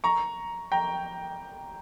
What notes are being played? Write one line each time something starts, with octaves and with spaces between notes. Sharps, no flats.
A#5 C#6
G5 A#5